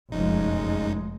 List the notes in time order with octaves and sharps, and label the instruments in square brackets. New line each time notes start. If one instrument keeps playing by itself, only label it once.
[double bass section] F1 G#3 [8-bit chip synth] A#1 F#2 D#4